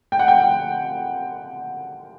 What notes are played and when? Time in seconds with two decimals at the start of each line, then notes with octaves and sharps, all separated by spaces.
0.12 G5
0.19 F#5
0.28 G5